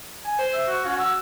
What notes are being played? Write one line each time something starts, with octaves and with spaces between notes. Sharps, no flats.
G#5
C5
E5
F#4
C#4 F#4
E6